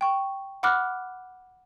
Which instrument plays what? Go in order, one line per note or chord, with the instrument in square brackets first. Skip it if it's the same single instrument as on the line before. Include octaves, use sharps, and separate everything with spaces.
[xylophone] G5 C#6
F#5 B5 D6 F6 F#6